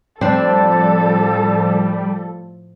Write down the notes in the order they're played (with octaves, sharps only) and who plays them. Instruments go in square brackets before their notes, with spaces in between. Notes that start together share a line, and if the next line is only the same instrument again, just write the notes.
[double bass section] A2 F3 [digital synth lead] G3 [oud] C4 D4 [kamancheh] A4